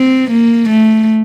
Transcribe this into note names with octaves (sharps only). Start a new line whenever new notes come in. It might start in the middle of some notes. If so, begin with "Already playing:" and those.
Already playing: C4
A#3
A3